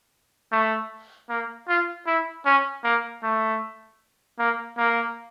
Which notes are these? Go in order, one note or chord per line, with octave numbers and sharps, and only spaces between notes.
A3
A#3
F4
E4
C#4
A#3
A3
A#3
A#3